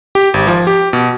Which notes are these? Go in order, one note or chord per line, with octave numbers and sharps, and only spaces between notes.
G4
G#1
F3
G4
B2